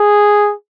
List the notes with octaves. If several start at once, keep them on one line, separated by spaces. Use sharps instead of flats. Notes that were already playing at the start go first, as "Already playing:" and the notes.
Already playing: G#4